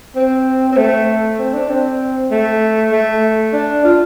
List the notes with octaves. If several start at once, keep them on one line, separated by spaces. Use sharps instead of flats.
C4
C4
A3
C4
D4
C4
A3
A3
D4
F4